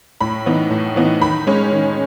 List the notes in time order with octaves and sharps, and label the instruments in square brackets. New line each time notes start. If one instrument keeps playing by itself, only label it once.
[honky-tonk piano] A2 B5
E3 B3 D#4
A2
E3 B3 D#4
D#3 B5
G#3 C#4
D#3